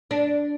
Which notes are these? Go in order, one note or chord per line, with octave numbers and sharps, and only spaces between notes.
D4